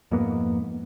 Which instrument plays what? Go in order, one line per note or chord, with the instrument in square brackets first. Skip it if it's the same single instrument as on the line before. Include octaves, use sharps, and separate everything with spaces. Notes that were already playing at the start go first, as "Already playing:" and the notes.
[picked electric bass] F2 G#2 A#3 B3